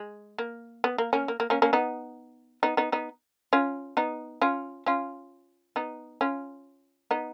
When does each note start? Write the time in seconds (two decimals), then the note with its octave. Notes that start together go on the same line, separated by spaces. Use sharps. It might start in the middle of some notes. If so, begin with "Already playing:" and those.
Already playing: G#3
0.39 A#3
0.84 B3
0.98 A#3
1.13 A#3 C#4
1.28 A#3
1.40 A#3
1.50 A#3 C#4
1.62 A#3 C#4
1.73 B3 D#4
2.63 B3 D#4
2.77 B3 D#4
2.92 B3 D#4
3.53 C#4 F4
3.97 B3 D#4
4.41 C#4 F4
4.86 C#4 F4
5.76 B3 D#4
6.21 C#4 F4
7.11 B3 D#4